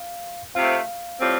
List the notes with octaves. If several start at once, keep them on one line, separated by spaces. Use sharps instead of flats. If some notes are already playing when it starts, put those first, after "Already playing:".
Already playing: F5
C3 A3 C4 F4 F5
A2 G3 C4 F4